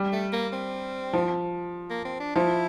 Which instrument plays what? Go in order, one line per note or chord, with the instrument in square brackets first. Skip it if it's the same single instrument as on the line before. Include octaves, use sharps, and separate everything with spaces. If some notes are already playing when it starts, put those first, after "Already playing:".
Already playing: [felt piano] G3
[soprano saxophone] A3
A#3
C4
[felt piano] F3
[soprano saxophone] A#3
C4
D4
[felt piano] F3 [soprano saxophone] E4